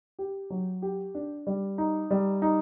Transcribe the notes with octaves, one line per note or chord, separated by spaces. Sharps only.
G4
F#3
G4
D4
G3
D#4
G3
D#4